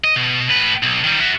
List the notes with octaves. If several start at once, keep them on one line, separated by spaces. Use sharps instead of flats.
D#5
B2
A2 B4
B1
D#3 G3
F#4 E5